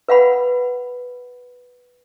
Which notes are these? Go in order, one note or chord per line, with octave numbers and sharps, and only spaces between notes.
B4 F5 F#5 B5